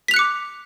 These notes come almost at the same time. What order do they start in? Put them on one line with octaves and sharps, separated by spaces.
B6 F7 F#6 C#7 D6